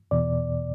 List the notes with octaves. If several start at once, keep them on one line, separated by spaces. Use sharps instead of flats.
E2 B2 D5